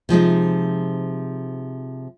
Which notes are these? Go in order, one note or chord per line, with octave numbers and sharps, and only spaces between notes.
C3 F3 G#3 D#4